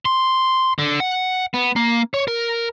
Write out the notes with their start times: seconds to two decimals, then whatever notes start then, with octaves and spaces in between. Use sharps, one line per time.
0.05 C6
0.79 D3
1.00 F#5
1.54 B3
1.76 A#3
2.14 C#5
2.28 A#4